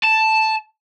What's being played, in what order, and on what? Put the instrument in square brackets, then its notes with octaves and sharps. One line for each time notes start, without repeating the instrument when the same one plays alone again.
[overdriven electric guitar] A5